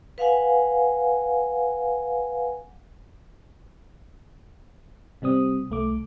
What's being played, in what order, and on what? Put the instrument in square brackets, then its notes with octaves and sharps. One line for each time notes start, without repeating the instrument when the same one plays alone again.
[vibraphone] B4 F5 F#5 G#5
[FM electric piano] C3 G3 C4 D#6
C2 A3 D6